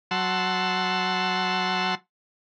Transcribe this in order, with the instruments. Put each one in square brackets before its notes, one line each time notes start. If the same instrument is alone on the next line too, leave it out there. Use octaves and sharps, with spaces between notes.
[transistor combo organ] F#3 F#5 A5 C6 E6